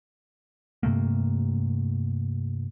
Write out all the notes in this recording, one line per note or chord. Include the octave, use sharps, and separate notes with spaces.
G2 C3 A3 A#3